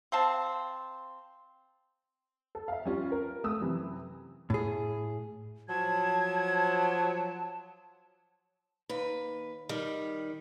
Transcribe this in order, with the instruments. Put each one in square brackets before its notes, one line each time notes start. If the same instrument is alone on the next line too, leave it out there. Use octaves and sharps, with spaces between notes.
[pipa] C4 F5 A5
[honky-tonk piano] A4
E5 F5
G3 C#4 F4
A#4
A3 D#6 E6
F#2 C3 E3
[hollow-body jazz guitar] A2 G#4
[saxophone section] F3 F#3 [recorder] A5 [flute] G#6
[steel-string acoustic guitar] D#2 B4
D#3 G3